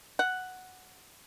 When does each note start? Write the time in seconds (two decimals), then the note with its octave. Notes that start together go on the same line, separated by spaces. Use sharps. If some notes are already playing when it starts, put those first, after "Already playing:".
0.19 F#5